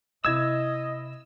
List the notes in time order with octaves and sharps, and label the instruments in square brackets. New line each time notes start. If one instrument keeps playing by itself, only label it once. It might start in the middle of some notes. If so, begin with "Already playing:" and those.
[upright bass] C3 [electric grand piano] E4 G#6 E7 [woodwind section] D#5 [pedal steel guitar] E6